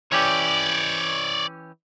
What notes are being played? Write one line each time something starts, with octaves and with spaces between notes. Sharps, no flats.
E3 C#4 G4 C#5 D5